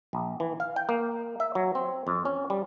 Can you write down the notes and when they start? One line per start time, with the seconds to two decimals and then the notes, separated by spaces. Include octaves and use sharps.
0.13 A#1
0.40 E3
0.60 F5
0.76 G5
0.89 A#3
1.40 E5
1.55 F#3
1.75 C4
2.07 F2
2.25 C#4
2.50 G3